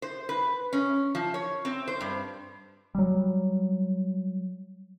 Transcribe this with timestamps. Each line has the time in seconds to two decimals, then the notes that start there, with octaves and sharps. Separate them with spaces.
0.02 C5
0.29 B4
0.73 C#4
1.15 F3
1.34 C#5
1.65 C4
1.88 C5
2.01 G2
2.95 F#3 G3